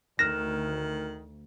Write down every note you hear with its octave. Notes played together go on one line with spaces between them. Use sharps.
D2 D#3 F6 F#6 A#6 E7